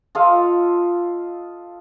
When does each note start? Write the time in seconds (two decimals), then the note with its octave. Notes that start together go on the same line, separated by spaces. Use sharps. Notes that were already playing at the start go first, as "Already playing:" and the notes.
0.15 F4 A4 D#5 F5